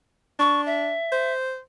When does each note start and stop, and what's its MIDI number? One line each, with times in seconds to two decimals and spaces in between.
0.39 0.95 62
0.39 0.61 85
0.66 1.33 76
1.12 1.60 72